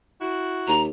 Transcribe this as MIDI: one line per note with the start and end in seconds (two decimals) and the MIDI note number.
0.21 0.73 64
0.21 0.73 66
0.68 0.89 39
0.68 0.82 82